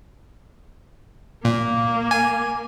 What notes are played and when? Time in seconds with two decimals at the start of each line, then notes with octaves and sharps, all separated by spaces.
1.45 A#2 A#3
2.11 G#5